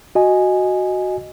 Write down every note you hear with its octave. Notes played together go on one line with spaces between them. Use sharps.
F#4 D#5 G#5